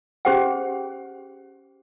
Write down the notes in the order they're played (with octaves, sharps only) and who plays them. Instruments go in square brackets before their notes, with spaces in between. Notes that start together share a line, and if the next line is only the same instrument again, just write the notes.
[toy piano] C#4 G4 G#4 C5 F#5 G5